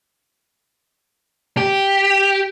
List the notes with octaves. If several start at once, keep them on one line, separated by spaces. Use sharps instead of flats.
G4